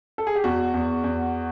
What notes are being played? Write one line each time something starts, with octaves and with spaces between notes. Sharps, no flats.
A4
G#4
G4
E2 F#4
E2
E2